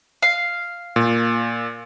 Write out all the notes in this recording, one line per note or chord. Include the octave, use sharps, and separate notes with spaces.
F5
A#2